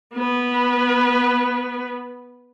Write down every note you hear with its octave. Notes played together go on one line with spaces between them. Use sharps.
B3 B4